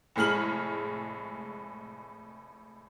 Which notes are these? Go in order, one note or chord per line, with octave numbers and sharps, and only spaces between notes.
F1 A2 G#3 F6 F#7